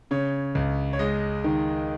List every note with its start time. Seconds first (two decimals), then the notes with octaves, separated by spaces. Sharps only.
0.11 C#3 C#5
0.55 C#2
0.93 C#5
0.99 G#3 D#5
1.44 D#3